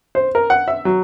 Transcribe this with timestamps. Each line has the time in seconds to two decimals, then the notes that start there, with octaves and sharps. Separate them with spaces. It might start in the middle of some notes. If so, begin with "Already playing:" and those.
0.15 C5
0.35 A#4
0.50 F#5
0.68 E5
0.85 F#3